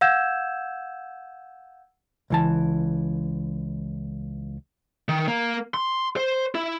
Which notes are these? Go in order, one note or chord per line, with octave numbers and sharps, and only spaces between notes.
F5 F#5 E6 G6 G#6 E7
C#2 E3 A5
D#3
A#3
C6
C5
E4